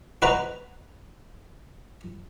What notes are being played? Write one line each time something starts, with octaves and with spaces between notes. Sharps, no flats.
F#4 B4 C5 D#5 A#5